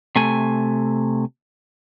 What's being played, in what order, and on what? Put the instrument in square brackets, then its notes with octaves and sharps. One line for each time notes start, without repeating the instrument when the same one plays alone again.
[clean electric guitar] C3 A3 G#5